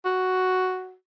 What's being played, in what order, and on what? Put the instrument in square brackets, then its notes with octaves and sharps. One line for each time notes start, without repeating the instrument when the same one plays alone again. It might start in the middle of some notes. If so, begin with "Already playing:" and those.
[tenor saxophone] F#4